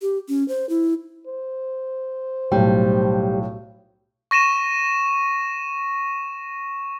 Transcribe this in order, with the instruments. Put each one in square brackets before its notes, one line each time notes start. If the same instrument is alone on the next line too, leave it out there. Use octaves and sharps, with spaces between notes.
[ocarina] G4
C#4
C5
E4
[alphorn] C5
[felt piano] B1 A2 [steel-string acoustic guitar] G3
[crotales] C#6 A#6 D#7 E7